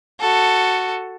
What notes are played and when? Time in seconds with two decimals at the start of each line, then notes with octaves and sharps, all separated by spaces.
0.20 F#4 A4